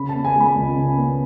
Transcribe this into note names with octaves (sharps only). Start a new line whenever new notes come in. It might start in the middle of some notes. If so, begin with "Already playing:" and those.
Already playing: C#3 B5
A5
B3
G#5
G#3 B5
C#2
C#3
B3